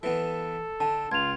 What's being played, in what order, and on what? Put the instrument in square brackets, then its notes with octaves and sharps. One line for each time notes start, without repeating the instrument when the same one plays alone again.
[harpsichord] E3 B3 [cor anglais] A4
[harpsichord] D3 [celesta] A5
[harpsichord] C#2 [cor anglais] F4 [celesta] G#6 F7